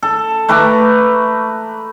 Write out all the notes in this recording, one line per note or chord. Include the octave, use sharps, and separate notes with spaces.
A4
A3 B4 A#5 D6